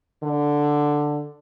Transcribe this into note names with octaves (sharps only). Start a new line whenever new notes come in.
D3